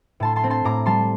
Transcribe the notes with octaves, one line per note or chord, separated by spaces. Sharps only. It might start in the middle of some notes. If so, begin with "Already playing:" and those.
A2 A5 C6
A5 C6
C4
A5 C6
A2 A#5 D6
G3 A5 C6